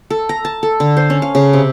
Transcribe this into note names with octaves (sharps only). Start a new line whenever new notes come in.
A4
A#5
A5
A4
D3
C5
C#4
F5
C#3
C3